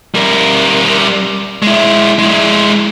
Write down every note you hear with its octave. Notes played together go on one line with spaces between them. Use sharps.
G3 A#4
G#3 E4
G#3 E4